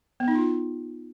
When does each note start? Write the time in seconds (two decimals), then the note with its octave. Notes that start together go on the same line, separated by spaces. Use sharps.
0.20 B3
0.28 D#4
0.35 F4